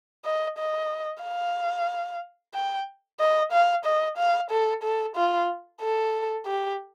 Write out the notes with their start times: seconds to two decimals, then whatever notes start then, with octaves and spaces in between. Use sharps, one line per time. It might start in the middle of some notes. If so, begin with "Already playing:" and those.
0.25 D#5
0.58 D#5
1.23 F5
2.54 G5
3.20 D#5
3.52 F5
3.85 D#5
4.18 F5
4.50 A4
4.83 A4
5.16 F4
5.81 A4
6.46 G4